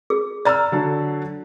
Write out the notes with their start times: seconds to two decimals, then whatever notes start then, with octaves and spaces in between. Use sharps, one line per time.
0.10 G#4
0.45 D5 A#5 E6 F6 A6
0.72 D3 F#3 A4